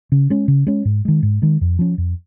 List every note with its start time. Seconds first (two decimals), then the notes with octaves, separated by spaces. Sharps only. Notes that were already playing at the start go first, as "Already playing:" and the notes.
0.12 C#3
0.30 G#3 C#4
0.48 C#3
0.67 G#3 C#4
0.85 G#2
1.05 D#3 G#3
1.23 G#2
1.42 D#3 G#3
1.61 F2
1.79 F3 C#4
1.98 F2